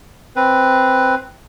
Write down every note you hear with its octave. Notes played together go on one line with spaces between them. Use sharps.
C4 B4